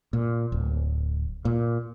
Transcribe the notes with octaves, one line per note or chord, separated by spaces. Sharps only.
A#2
D1
A#2